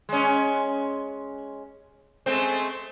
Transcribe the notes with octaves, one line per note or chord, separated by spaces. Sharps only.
G#3 C#4
G#3 A3 C4